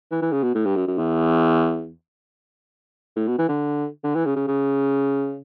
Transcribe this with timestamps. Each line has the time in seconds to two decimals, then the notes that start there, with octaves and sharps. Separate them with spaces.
0.11 E3
0.22 E3
0.32 C#3
0.43 B2
0.55 A2
0.65 G2
0.76 F#2
0.87 F#2
0.98 E2
3.16 A2
3.27 B2
3.38 E3
3.49 D3
4.04 D3
4.15 E3
4.26 C#3
4.36 C#3
4.47 C#3